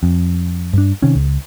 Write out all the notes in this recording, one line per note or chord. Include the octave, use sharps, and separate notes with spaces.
F2
G2 D4
C3 D#3 C#4
C#2